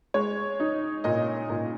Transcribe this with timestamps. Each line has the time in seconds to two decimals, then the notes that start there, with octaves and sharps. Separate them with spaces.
0.14 G#3 C#5
0.60 D#4
1.04 A#2 D#5
1.50 A#2